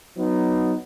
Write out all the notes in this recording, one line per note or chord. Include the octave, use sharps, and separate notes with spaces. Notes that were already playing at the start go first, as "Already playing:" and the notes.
F#3 B3 D#4